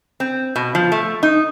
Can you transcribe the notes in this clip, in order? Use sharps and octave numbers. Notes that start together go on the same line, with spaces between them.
C4
B2
F3
A3
D#4